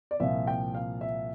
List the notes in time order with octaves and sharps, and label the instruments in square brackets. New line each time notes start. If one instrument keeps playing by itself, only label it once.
[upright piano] D5
C2 A#2 F3 E5
G5
F5
E5